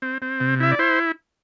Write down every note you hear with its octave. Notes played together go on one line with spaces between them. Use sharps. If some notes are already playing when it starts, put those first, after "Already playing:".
C4
C4
C3
E4 E5
D5
E4 C5